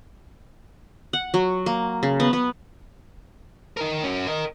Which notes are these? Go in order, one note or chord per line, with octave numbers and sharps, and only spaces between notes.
F#5
F#3
A#3
C#3
B3
B3
D#4 A#4
C#4 F#4
A#4 D#5